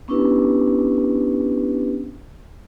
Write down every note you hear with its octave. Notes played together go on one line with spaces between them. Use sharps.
B3 C#4 D4 E4 G4 B4